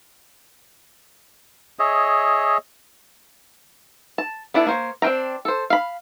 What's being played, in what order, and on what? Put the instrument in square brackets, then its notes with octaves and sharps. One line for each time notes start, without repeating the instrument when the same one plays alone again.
[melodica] G#4 C#5 D#5 E5
[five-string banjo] A5
B3 D4 E4 A4
A#3 C5 C#5
C4 D4 F4 G5 A#5
A4 C5
F5 B5